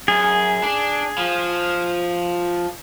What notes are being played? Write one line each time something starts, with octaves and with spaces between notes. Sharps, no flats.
F#2 G#4
D4
F3